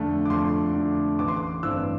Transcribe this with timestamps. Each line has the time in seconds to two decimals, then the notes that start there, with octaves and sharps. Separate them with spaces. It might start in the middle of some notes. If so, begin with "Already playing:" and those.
Already playing: F2 D3 A3
0.25 D6
0.30 F2 C6
0.75 D3 A3
1.19 A1 D6
1.28 C6
1.37 D6
1.63 G2 E3 A3 C4 E6